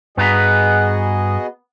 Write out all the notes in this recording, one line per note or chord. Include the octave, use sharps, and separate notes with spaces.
G2 B3 F#4 G#4 B4 D#5 A#5